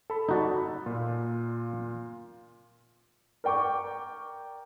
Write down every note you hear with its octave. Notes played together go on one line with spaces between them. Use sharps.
A4 B5
D#4 F#4 D5
A#2 F4
A#4 D5 G5 C#6 D6